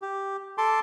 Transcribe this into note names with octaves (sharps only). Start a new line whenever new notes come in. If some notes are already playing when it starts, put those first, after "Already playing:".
G4
A4 A5 C6 D6